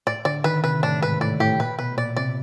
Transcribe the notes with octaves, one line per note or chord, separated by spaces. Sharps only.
A2 D5
D3 D5
D#3 B4
C3 B4
A2 D4
G#2 B4
A2 D5
A2 G4
A#2 B4
B2 B4
A#2 D5
C3 D5